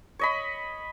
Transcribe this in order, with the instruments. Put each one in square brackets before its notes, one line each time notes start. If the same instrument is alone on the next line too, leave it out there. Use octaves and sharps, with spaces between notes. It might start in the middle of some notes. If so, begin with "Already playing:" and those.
[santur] C#5 D#5 B5